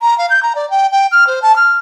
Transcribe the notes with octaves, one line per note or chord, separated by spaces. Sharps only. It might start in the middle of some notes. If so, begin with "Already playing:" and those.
A#5
F5
G6
A#5
D5
G5
G5
F6
C5
A5
F6